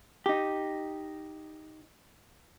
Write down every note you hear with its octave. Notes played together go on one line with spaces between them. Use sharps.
D#4 G4